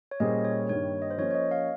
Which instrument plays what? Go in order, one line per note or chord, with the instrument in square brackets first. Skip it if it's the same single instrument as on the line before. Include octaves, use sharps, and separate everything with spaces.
[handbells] C#5
[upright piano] A#2 G3 C#4 G#4 C5 [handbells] D#5
[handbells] C#5
[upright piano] G2 D#3 G3 A#3 D#4 [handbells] C#5
[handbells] D#5
C5
[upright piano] F3 A#3 C#4 [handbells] C#5
[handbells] C#5
D#5
F5